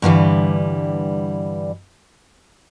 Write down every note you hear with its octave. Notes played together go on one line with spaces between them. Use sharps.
G2 D3 E3 G3